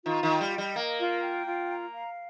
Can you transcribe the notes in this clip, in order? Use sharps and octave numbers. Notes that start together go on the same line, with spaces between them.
D#3 F4
D#3
G5
G3
D#5
G3
A#3 A#4
F4
G5
F4
A#5
F5